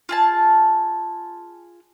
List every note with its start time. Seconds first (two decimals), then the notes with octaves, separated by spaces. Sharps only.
0.09 F4 G#4 A5